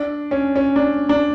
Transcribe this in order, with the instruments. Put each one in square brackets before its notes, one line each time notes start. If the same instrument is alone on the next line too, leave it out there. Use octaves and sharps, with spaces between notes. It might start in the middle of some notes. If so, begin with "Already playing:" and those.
Already playing: [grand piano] D4
C#4
C#4
D4
D4